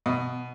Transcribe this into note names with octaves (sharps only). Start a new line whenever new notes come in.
B2